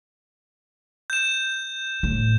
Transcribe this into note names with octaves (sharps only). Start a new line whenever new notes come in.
G6 E7
A2